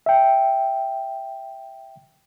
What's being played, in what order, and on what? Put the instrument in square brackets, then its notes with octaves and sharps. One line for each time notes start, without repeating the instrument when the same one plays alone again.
[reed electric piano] E5 G5